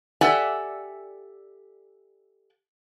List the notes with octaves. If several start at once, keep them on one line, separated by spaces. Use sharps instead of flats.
G4 A4 D5 E5 F#5 G#5